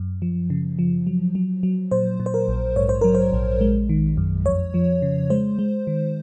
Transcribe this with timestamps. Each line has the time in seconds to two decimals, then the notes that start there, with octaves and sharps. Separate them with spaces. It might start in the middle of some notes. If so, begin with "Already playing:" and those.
Already playing: F#2
0.22 F3
0.50 C#3
0.79 F3
1.07 F#3
1.35 F#3
1.63 F#3
1.91 A#2 C5
2.20 A#2
2.26 C5
2.34 A#4
2.48 A#1
2.76 G#2 C#5
2.89 C5
3.01 F#3 A#4
3.15 C5
3.33 A#1
3.61 G#3
3.89 D#3
4.17 F#2
4.46 F2 C#5
4.74 F3
5.02 C#3
5.30 G#3 C5
5.59 G#3
5.87 D#3